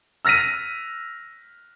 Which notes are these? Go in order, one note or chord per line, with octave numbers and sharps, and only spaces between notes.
E6 F6 A#6 B6 D#7